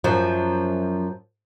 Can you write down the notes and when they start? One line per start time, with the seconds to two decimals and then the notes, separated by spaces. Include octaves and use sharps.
0.04 F#2 F3